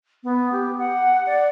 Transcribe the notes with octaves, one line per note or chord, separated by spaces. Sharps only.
B3
G4
F#5
D5